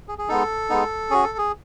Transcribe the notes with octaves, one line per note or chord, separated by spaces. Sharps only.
G#4
G#4
G#3 B3 D#4 A4
G#3 B3 D#4
C#4 F#4 G#4
A4
G#4